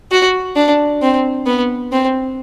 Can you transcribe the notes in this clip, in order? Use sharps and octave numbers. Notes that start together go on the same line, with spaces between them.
F#4
D4
C4
B3
C4